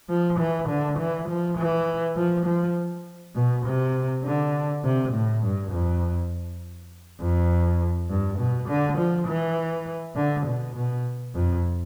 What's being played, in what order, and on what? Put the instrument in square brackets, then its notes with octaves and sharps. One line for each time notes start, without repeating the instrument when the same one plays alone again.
[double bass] F3
E3
D3
E3
F3
E3
F3
F3
B2
C3
D3
C3
A2
G2
F2
F2
G2
B2
D3
F3
E3
D3
B2
B2
F2